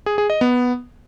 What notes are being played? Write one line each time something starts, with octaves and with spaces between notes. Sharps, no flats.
G#4
G#4
D#5
B3